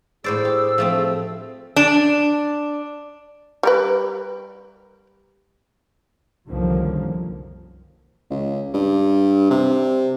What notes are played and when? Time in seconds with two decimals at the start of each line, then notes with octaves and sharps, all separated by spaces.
0.24 A2 G#4 C5 D5 E6
0.45 G4
0.78 F3 A3 C4
1.76 D4
3.63 G3 A#4 B4
6.46 C2 F#2 D3 D#3 F3 A#3
8.30 C#2
8.74 G2
9.50 C3